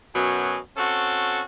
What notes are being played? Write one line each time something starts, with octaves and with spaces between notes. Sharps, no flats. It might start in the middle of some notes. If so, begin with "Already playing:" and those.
F#2 B2 F#3 G#5
C4 C#4 F#4 A4